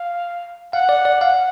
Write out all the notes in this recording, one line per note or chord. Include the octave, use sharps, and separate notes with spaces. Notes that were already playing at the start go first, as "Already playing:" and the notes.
Already playing: F5
F5 F#5
D5
D5
F5 F#5